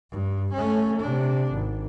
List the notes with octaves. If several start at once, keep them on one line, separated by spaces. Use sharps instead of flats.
G2
A3 C#4
C3 D4
G#1